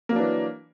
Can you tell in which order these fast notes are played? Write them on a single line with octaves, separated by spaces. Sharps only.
A#3 F#3 D4 E3